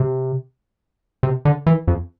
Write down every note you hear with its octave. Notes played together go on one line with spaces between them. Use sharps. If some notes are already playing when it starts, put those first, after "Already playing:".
Already playing: C3
C3
D3
E3
F2